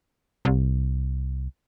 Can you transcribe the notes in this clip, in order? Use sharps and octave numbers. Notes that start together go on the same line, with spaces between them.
C2